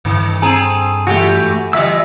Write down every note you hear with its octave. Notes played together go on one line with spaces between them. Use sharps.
G2 D#3 A3
C4 G#4 A4 G#5 A#5 D#7
E3 A3 F#4 G4
E3 G3 D#5 E5 E6